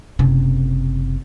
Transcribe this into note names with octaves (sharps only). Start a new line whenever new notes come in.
F#1 C3